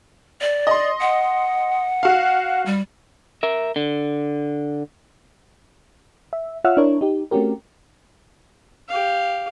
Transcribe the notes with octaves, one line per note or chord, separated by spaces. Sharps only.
D5
D#5 C6
F#5
F#4 F5
G3
A#4 E5
D3
E5
F4 C#5 E5 F#5 E6 F6
D4 E4 A#4 C#5
D#4 G4
A3 C4 C#4 F#4 G4 A#4
G4 F5